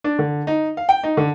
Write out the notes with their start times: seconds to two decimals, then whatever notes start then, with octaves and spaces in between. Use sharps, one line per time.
0.04 D4
0.19 D3
0.47 D#4
0.77 F5
0.89 G5
1.03 D#4
1.17 D3